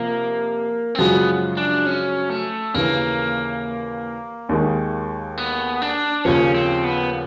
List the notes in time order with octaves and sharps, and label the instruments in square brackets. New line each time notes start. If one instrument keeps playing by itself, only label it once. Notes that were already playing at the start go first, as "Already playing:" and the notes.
Already playing: [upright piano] C3 F3 [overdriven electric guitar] A#3
[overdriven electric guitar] C4
[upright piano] F#2 C#3 F3 G#3 [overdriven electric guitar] B3
[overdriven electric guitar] D4
C#4
A3
[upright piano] D#2 C#3 E3 [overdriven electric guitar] A#3
[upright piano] D#2 D#3 G#3
[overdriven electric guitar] B3
D4
[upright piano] D#2 C#3 F3 [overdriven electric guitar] C#4
[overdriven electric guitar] C4
B3